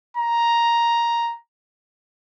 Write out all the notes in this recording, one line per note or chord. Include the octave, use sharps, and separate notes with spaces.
A#5